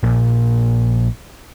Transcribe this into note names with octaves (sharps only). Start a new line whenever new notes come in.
A#1 A#2 A#3